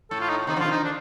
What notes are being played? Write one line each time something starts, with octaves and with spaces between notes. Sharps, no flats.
A2 A4
F4
D#4
C3 D#3 D#4
D3 F3 F4
C3 D#3
D#4
D4